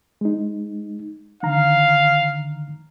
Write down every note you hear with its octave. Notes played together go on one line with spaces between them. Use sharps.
G#3 D#4
D3 D#3 F5 A#5